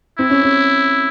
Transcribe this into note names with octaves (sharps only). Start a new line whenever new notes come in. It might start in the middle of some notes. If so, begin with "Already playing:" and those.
C4 E4
C#4
C#4